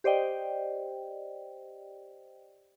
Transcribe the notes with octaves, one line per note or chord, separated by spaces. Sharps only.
G4 C5 D5 D#5 G5